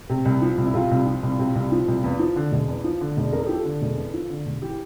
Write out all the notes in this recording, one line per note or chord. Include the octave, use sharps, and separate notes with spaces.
C3
C2
F3
C2
E4
C3 F4
C2
F3
C2
C3
C2
F3
C2
E2
F3
D3
E1
E2
F3
D3
E1
E2 A#4
A4
G4
F3
A4
D3
E1
E2
F3
D3
E1
E3 G4